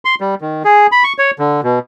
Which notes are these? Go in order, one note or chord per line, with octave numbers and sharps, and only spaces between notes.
C6
G3
D#3
G#4
B5
C#6
C#5
D3
B2